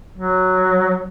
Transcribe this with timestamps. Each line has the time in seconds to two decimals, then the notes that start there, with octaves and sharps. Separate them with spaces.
0.18 F#3